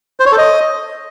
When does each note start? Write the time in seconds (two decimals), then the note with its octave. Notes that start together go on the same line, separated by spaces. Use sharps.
0.20 C5
0.26 C#5
0.32 A4
0.38 D#5